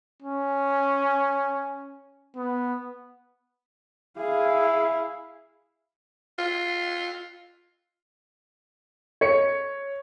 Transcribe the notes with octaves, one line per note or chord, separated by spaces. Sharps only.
C#4
B3
E4 G#4 F5
F4
C#5 C#7